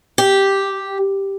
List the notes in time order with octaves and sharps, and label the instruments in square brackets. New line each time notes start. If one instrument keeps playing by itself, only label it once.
[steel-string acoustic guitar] G4